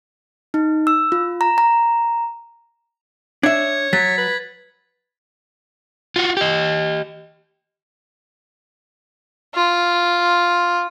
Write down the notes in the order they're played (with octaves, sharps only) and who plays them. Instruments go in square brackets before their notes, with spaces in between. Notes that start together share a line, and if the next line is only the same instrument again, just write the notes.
[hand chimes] D#4
E6
F4
A#5
A#5
[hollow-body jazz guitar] D4 E5 [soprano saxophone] C#5 [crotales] G#6
[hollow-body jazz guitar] F#3 [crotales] A6 B6
[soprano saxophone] B4
[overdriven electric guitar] F4 F#4
G4 D#5
[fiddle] F4